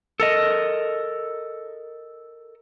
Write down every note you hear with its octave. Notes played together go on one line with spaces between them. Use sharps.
A4 A#4 D#5